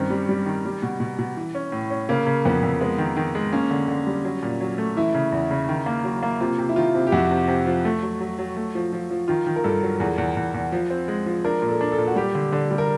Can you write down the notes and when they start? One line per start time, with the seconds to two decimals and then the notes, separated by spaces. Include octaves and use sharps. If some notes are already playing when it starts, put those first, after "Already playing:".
Already playing: G2 D#3 C4 C#4
0.10 G3
0.29 G3
0.46 D#3
0.65 G3
0.82 B2
1.00 B2
1.19 B2
1.37 E3
1.55 C#4
1.72 A2
1.90 C#4
2.09 C#3 A#3
2.27 C#3
2.45 F2 B3
2.63 F2
2.81 G#3 B3
2.98 D#3
3.17 D#3
3.35 G#3
3.53 A#3 C#4
3.71 D3
3.88 D3
4.07 G3
4.25 F#3
4.42 A#2
4.61 F#3
4.78 A3
4.97 E3 E4
5.14 C#3
5.32 E2
5.51 C#3
5.69 D#3
5.86 A#3
6.04 F#3
6.23 A#3
6.41 C3 F4
6.58 C3
6.69 E4
6.76 D#3 F4
6.95 C3
7.07 G4
7.12 F2 F#4
7.31 C3
7.48 C3
7.66 F3
7.85 A3
8.03 F#3
8.20 F#3
8.38 F#3
8.56 A3
8.75 F3
8.93 F3
9.11 F3
9.28 D#3 F4
9.47 D#3
9.56 A#4
9.64 G2 A4
9.82 F#3
10.00 E2 G#4
10.18 E2
10.37 E2
10.54 E2
10.72 F3
10.90 C4
11.08 G#3
11.26 F3
11.44 D4 A#4
11.62 A#2
11.69 A4
11.81 D4
11.92 A4
11.98 A#2
12.08 F#4
12.16 G3 G4
12.35 D3
12.52 D3
12.71 G3
12.78 A#4